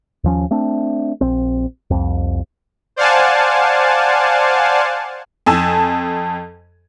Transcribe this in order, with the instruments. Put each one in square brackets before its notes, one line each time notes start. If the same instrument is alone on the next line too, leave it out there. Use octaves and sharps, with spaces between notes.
[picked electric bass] D#2 F3 C#4
A3 C4 D4
A#1 C4
C2 F2
[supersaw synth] C5 D5 F5 F#5 G#5 A5
[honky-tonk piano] F2 G#5 A5 E6